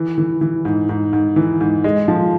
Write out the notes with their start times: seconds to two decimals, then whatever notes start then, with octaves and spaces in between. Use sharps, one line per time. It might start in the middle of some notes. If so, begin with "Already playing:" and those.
Already playing: E3
0.18 E3
0.41 E3
0.65 G#2
0.89 G#2
1.13 G#2
1.36 E3
1.61 G#2
1.84 G#3
2.08 F3